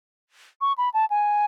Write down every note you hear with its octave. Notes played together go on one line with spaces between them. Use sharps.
C#6
B5
A5
G#5